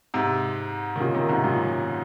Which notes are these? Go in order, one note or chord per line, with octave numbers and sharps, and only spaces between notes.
G#2 C3
D#3
A#2 C#3
C3 D#3
G#2 C3
F#2 A#2